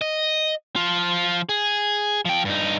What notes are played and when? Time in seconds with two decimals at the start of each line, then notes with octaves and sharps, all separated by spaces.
0.01 D#5
0.76 F3 F4
1.49 G#4
2.25 F3 G5
2.45 G2 D#4